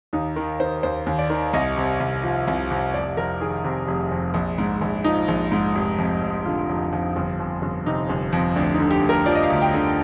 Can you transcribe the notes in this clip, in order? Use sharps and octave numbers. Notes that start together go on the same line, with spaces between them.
D#2 D#4
D#3
D#3 C5
D#2 C5
D#2
D5
D#3
C2 D#5
C3
C2
F3
C2
C3
F1 D5
F2 A#4
D#3 G#4
C3
F1
F2
A#1
G#2
A#1
F3 D#4
A#1
G#2
F1
F2
F1
D3 F4
F1
F2
G1
F2
G1
C3 D#4
G1
F2
D2 D4
D#4
D3
G4
D2
A#4
F3 D5
D#5
F5
D2
G5
D3